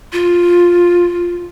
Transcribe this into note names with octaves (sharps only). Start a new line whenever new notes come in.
F4